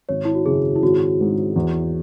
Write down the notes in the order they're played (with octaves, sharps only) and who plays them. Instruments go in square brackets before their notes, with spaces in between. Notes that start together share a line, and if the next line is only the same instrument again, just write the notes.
[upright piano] G#1 [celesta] C#5
[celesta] E4
F#4
[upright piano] F#2 C#3 [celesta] G#4
[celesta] E4
[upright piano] G#1 [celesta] F#4
[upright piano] G#2 G#3
E2